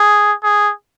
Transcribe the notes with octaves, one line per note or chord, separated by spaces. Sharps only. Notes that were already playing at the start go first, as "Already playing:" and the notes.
Already playing: G#4
G#4